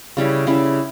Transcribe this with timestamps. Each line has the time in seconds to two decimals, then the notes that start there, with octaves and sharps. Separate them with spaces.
0.17 C#3 G3 C#4 E4
0.47 C#3 G3 C#4 E4